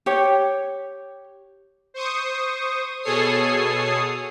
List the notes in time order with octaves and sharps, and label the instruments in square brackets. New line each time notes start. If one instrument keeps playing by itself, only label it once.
[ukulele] G4 C#5
[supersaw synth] C5 C#6 D#6
B2 G#4 A4 C#5 D#6 C7